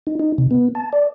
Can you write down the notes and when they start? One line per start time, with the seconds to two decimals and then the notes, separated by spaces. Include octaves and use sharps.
0.07 D#4
0.20 D#4
0.38 C3
0.51 B3
0.75 A5
0.93 D5